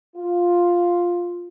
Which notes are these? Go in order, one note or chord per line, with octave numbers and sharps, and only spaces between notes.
F4